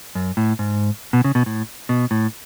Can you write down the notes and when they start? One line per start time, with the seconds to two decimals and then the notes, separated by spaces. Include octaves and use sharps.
0.15 F#2
0.37 A2
0.59 G#2
1.13 B2
1.24 C#3
1.35 B2
1.46 A2
1.89 B2
2.11 A2